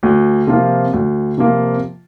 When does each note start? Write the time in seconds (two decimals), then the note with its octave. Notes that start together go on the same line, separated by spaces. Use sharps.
0.03 D2
0.47 C3 F3 A#3 F4
0.93 D2
1.38 C3 F3 A#3 F4